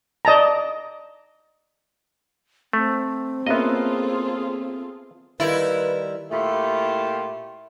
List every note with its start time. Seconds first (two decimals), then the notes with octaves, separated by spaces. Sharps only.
0.25 D5 D#5 A5 A#5
2.73 A3 C4
3.47 A#3 B3 C#4 F4 G#4 A4 D#5 E5
5.40 D#3 G3 E4 F4 B4
6.31 A#2 A3 E4 F4 G4